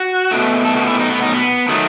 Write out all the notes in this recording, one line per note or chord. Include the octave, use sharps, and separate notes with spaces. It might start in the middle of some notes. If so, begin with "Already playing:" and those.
Already playing: F#4
B2 A3
A4
F#4
E4
D#4
B3
D#4
B3
D#3 F#3 A3